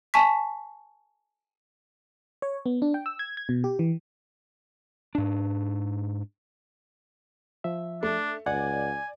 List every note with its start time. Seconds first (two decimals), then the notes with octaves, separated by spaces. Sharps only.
0.14 G#5 A5 C#6 B6
2.42 C#5
2.66 B3
2.82 D4
2.94 G5
3.06 E6
3.19 G#6
3.37 G#6
3.49 B2
3.64 G4
3.79 E3
5.15 G#2 D4
7.64 F3 E5
8.03 A3 D4
8.46 C#2 D5 F#5 G#5